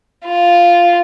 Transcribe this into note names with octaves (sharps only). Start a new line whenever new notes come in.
F4